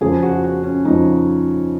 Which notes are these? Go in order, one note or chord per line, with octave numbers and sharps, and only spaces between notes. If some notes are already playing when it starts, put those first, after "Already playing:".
F2 C#3 F3 G#4
F#4
F#4
C#4
F2 C#3 F3 D#4